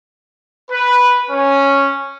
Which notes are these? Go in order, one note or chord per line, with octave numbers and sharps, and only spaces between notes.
B4
C#4